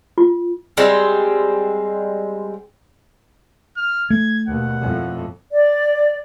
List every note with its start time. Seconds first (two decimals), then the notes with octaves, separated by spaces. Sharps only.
0.18 F4
0.77 G3 G#3 C4
3.77 F6
4.10 A3 G#6
4.48 D#2 B2 F#5
4.81 F2 A2
5.51 D5